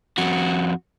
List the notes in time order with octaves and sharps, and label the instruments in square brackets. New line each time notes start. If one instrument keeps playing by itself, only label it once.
[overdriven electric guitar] F2 F#4